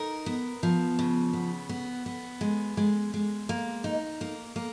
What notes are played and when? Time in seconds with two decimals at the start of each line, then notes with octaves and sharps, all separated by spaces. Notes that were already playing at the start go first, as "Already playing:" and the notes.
Already playing: D#4 A#4
0.26 B3
0.63 F3
0.99 C#3
1.33 B3
1.69 B3
2.06 B3
2.41 G#3
2.77 G#3
3.14 G#3
3.49 A#3
3.84 D#4
4.21 A#3
4.56 A#3